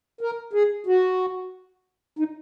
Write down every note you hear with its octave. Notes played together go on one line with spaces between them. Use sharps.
A#4
G#4
F#4
D#4